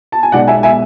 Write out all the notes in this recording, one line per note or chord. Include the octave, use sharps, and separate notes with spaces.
A5
G#5
B1 B2 G#3 D5 F#5
E5 G#5
E5 G#5